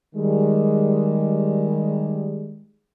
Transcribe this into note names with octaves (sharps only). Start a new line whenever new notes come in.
D#3 G3 G#3